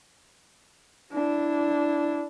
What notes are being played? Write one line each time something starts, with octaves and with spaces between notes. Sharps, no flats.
D4 E4